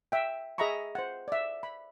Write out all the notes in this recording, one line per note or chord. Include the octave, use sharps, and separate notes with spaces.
E5 G5
G#4 D#5 E5 A#5 B5 C#6
C5 F#5
D5 E5
B5